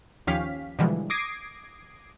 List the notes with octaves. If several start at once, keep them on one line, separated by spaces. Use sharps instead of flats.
D#2 F3 C#4 G4 F5 B6
B2 D3 E3 F3 G3 G#3
D6 D#6 G#6 A#6 C7 D7